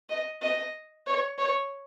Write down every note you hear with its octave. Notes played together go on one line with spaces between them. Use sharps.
D#5
D#5
C#5
C#5